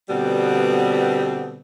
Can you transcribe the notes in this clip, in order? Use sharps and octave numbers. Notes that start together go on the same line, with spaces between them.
B2 D3 G3 B3 C4